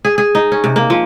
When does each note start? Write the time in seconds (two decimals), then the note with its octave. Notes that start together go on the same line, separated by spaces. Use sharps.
0.05 G#4
0.18 G#4
0.35 D#4
0.52 C#4
0.64 C3
0.76 A#3
0.90 F3